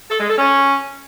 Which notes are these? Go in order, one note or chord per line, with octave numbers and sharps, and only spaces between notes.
A4
G#3
A4
C#4